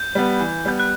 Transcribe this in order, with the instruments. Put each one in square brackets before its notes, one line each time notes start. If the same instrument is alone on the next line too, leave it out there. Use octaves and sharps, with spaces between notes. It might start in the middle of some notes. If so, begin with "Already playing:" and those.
Already playing: [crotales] G6
[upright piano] G3 B3
E3
[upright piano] G3 B3 [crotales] G6
[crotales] F#6